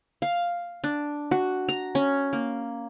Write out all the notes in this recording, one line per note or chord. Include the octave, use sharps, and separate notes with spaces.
F5
D4
F#4
A#5
C#4
A#3